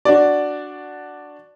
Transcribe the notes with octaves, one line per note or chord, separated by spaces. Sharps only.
D4 F#4 D5